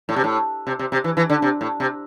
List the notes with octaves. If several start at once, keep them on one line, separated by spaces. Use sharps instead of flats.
A2
C3
A2
C3
C3
C3
E3
E3
D3
C3
A2
C3